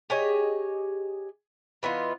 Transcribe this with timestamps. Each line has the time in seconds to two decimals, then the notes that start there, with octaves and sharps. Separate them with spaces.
0.10 G4 G#4 C#5 D#5
1.83 E3 B3 D#4 F4